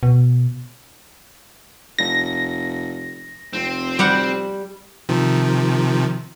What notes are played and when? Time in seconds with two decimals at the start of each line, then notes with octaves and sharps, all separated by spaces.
0.03 B2
1.99 F1 A#6
3.53 F1 C4
3.99 G3 G4 F#5
5.09 C3 D#3 F3